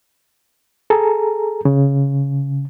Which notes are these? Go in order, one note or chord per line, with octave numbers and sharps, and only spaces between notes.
G#4 A4 A#5
C#3